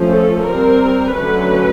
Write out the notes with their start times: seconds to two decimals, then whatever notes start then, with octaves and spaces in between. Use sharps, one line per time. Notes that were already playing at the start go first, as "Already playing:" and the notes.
Already playing: F3 A3 C#4
0.10 A4
0.45 G3 C4 A#4
1.14 D3 F#3 A3 C#4 B4